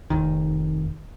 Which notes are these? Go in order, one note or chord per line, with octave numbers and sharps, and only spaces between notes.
F1 D#3